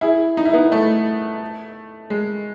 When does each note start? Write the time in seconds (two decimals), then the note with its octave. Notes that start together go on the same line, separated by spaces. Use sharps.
0.01 E4 G#4
0.37 D#4
0.45 E4
0.53 B3 D#4
0.72 A3
2.10 G#3